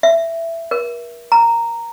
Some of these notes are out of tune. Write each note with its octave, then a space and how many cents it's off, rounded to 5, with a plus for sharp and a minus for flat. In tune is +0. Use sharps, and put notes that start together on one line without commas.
E5 +10
A#4 +45
A#5 -10